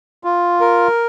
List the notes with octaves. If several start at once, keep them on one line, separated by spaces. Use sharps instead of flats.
F4
A#4